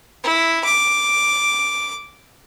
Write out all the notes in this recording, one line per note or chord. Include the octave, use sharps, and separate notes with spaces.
E4
D6